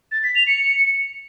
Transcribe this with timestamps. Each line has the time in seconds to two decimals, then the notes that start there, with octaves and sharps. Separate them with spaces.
0.11 A6
0.23 B6
0.35 F7
0.47 C#7